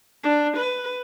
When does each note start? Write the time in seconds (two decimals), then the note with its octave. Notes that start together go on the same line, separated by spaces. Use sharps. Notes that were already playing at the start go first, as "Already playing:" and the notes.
0.24 D4
0.56 B4